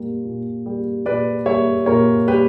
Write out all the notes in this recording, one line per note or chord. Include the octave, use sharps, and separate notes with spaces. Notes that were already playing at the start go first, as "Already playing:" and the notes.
Already playing: A#2 G3 A#3
A#2
G3 A#3
A#2 B4 D5
G3 A#3 C#5 E5
A#2 A#4 C#5
G3 A#3 G4 B4